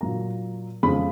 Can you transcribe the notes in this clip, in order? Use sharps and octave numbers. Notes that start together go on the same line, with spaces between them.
A#2 F#3 A#3 A#5
F2 C#3 F3 G#3 B5